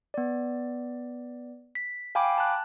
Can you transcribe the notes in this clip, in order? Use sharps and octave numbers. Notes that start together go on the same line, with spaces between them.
B3 D5
B6
F5 G5 G#5 B5 D6
A5 F#6